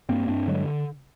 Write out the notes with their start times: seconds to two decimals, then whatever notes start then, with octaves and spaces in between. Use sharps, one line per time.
0.09 G2 A#3 C4
0.28 G2 C4 D4
0.47 D3 F#3 G#3